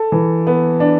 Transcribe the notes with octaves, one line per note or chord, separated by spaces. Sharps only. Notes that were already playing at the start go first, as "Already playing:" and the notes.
Already playing: A4
E3
B3
D4